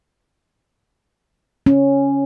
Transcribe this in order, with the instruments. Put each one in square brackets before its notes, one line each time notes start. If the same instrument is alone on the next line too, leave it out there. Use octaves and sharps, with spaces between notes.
[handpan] C#4